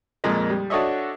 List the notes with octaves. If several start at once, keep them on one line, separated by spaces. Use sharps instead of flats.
F2 A#2 G#3 A#3
G3
D4 F#4 A4 C#5 D#5 E5